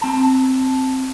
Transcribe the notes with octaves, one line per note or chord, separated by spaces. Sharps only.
C4 A5